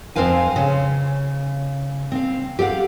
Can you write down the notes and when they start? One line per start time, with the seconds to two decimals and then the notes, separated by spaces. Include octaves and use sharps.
0.16 F2 C4 B4 C5 F5 G#5
0.56 C#3
2.12 C4 F5
2.59 G4 A4 F5 F#5